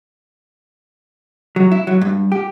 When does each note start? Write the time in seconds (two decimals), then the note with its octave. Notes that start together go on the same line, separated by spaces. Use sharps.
1.56 F#3
1.72 E4
1.87 F#3
2.01 G2
2.32 G4